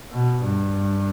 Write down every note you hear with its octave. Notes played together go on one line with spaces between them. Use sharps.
B2
G2